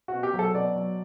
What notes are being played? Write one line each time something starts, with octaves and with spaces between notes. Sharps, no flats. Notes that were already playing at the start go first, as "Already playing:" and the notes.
B2 F#4
G4
F#3
A4
B2 D5
F#3